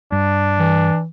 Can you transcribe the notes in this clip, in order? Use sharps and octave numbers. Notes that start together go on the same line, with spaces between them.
G2 D4
E3